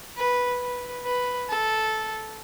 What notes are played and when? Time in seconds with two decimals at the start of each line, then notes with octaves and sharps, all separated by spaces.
0.17 B4
0.61 B4
1.05 B4
1.49 A4